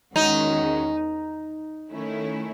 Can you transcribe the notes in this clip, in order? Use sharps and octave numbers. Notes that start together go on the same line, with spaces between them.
E2 D#3 G#3 C#4 D#4 F#4
D#3 A3 C#4 E4